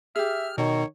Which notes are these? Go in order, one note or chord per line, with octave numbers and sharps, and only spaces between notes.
G4 G#4 E5 F6
B2 D#3 C#5